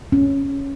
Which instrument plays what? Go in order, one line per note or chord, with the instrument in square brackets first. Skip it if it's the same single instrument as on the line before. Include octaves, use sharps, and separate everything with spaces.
[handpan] C#4